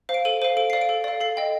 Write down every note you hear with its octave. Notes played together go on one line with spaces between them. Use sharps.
C5 F5
D7
A4 D#7
C5 F5 D#7
A4 D7
D5 F5 C7
D7
A4
D5 F5
A4 C7
D#5 G5